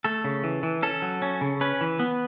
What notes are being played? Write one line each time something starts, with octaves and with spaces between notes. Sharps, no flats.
A3 A4
C#3
E3
E3
C#4 A4
F#3
C#4
C#3
C#4 B4
E3
B3